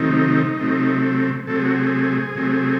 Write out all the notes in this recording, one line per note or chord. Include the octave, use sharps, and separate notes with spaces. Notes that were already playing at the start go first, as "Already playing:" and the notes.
Already playing: C3 D#3 F#3 A3 C4 D#4
C3 F#3 A3 C4
C3 F#3 A3 C4 A4
G#4
F#4
G#4
C3 F#3 A3 C4